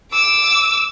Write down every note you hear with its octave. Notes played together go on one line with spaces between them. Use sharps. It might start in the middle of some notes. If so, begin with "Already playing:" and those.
D6 E6